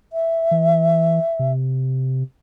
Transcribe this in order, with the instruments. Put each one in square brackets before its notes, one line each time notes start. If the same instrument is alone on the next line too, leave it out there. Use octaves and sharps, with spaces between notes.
[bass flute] E5
[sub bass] E3
C3